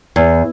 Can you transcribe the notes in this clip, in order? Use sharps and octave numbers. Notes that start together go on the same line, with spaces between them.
E2